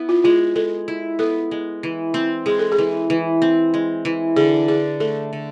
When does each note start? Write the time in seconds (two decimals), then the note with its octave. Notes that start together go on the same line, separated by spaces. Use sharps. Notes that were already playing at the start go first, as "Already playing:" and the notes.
Already playing: B3 E4
0.09 F4
0.24 G#3 F4
0.56 G#3 A4
0.88 E4
1.19 B3 A4
1.51 G#3
1.83 E3
2.14 C4
2.46 G#3 G#4
2.59 A4
2.72 G#4
2.78 E3
3.10 E3
3.42 C4
3.74 G#3
4.05 E3
4.36 D3 G#4
4.68 D4 G#4
5.00 A3 A4
5.33 D3